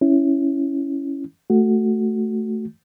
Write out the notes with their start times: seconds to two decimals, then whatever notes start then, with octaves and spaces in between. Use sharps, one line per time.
0.01 C#4 E4
1.50 A3 F#4